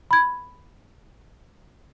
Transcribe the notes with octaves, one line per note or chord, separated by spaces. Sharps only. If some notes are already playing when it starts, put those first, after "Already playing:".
B5 G#6